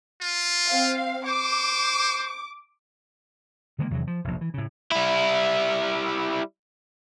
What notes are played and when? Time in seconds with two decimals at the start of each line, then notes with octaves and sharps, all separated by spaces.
0.21 F4
0.68 C4 F5
1.26 C5 D6
3.78 D3 D#3 G#3 A#3
3.91 E2 C3 D#3 F#3
4.07 F3
4.24 F1 A#1
4.41 E3
4.54 A2 C#3
4.91 G3 E4